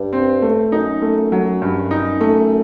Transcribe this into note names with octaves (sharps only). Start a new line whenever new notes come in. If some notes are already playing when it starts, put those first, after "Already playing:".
Already playing: G2
C4
A3
F#2 D#4
A3
F#3
G2
D#4
A3